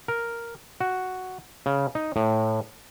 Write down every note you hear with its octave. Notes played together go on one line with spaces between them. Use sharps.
A#4
F#4
C#3
D#4
A2